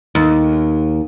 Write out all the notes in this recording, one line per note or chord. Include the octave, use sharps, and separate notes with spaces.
D#2